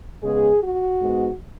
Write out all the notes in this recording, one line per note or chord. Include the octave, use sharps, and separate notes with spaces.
C#3 G#3 B3 G#4
F#4
G#2 G#3 B3